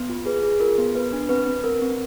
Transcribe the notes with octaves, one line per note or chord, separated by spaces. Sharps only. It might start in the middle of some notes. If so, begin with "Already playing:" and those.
Already playing: B3
F4
G#4 B4
G#4
F4 A#4
B3
B3 B4
D4
C4 B4
C4
C4 A#4
C4